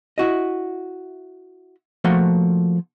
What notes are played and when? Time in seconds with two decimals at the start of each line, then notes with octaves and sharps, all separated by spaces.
0.18 E4 F#4 D#5
2.04 F3 A3 A#3 F#4 F#5 C6